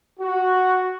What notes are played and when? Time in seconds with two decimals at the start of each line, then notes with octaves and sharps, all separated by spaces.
0.20 F#4